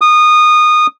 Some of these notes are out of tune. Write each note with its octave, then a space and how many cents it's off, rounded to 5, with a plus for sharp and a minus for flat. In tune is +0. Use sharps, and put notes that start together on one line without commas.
D#6 -20